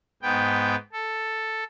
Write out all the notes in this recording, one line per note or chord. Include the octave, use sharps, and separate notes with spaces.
G#2 B3 G5
A4